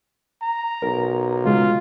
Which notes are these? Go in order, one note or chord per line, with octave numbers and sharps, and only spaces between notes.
A#5
B1 A#4
C#3 G#3 F4